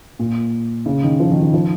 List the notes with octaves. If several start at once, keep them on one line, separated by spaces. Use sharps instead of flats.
A#2
C#3
D#3
F3
D#3
D#3
F3